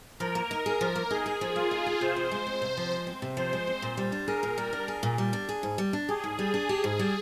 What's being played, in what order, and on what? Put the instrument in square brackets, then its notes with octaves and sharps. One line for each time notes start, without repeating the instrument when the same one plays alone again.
[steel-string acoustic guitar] F3 [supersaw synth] A#4
[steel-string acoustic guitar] A#3
D#4
G#4
F3
A#3
[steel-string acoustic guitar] D#4 [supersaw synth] G#4
[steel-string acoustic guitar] G#4
F3
[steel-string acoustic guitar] A#3 [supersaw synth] F4
[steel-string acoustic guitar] D#4
G#4
[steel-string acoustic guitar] C3 [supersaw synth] C5
[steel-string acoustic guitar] F3
G#3
C4
C3
F3
G#3
C4
C3
[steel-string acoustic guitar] F3 [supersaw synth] C5
[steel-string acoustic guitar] G#3
C4
A#2
G3
D4
[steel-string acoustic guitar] G#4 [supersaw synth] A#4
[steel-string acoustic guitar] A#2
G3
D4
G#4
A#2
G3
D4
G#4
G#2
G3
D4
[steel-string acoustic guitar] G4 [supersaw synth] G#4
[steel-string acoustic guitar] G#2
G3
[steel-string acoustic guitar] D4 [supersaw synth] G#4
[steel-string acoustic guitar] G4
G#2
G3